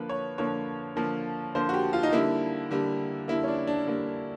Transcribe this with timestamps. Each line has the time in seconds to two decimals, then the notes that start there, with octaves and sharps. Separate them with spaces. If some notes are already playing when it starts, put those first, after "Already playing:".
Already playing: D3 F3 A#3 B4
0.09 C#5
0.38 D3 F3 A#3 C#5
0.96 D3 F3 A#3
1.55 D3 F3 A#3 C5
1.69 F#4
1.74 G4
1.93 F4
2.03 D#4
2.12 D3 G3 A#3 E4
2.71 D3 G3 A#3
3.28 D3 G3 A#3 E4
3.43 C#4
3.48 D4
3.67 D4
3.87 D3 G3 A#3